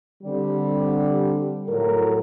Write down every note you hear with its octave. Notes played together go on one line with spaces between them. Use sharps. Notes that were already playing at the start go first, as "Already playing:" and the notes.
D3 G3 C4
A2 F#3 A4 A#4